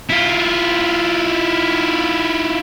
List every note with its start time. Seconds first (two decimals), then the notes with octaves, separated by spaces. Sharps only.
0.09 E4 F4